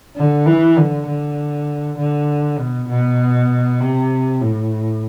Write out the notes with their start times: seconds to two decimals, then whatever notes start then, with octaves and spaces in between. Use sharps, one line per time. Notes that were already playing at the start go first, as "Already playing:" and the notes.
0.17 D3
0.46 E3
0.77 D3
1.07 D3
1.98 D3
2.58 B2
2.89 B2
3.80 C3
4.41 A2